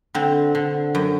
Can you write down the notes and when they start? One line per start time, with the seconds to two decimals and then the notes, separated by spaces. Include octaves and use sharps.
0.14 D3 C4
0.55 D3
0.95 F#2